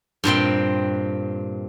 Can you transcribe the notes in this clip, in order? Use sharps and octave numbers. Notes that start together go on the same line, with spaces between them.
G2 A#2 C4 G5